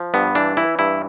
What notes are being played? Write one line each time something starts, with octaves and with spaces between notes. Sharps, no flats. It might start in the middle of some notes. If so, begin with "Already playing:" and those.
Already playing: F3
G2 B3
E3 D4
E3 E4
G2 E4